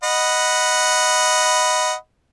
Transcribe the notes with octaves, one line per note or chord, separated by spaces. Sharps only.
D#5 F#5 B5